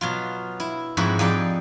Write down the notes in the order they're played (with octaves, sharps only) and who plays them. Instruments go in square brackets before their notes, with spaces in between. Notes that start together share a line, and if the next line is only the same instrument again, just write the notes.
[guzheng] B2 F#3 F4
E4
F2 G#2 E4 F#4 C#5 B5
F2 D#4 G4 G#4 D5